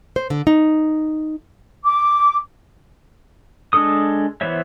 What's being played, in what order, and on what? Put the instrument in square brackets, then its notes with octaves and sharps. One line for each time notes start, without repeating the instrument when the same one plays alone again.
[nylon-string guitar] C5
D3
D#4
[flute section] D6
[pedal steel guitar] G#3 D4 A4 D#6
E3 B3 C5 C#5 E5